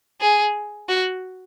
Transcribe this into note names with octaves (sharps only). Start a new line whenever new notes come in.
G#4
F#4